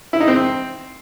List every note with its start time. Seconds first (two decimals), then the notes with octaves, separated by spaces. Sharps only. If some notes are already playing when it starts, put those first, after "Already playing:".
0.13 E4
0.20 D#4
0.28 C4